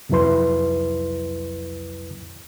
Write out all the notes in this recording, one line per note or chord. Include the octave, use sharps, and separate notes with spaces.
C2 F2 F#3 E4 B4 C6